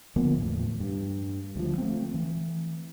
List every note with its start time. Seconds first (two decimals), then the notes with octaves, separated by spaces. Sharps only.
0.16 D3 F3 A#3 B3
0.38 E2 A2
0.80 G2
1.56 D2 F3
1.78 A3 C4
2.14 E3